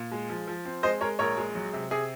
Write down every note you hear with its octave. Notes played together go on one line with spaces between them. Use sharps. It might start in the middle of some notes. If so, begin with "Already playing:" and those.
Already playing: A#2
G#3
F3
F3
C4
G#3 C5 D#5
G#3 A#4 C#5
A#1 A#4 C#5
G#3
F#3
C3
C3 G#4